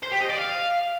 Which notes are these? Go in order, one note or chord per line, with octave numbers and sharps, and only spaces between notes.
C5
G4
D#5
D5
F5